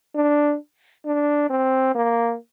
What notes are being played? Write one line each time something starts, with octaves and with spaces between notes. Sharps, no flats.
D4
D4
C4
A#3